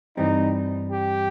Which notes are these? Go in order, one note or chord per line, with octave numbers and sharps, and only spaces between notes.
G2 E3 G3 C4 D#4
G4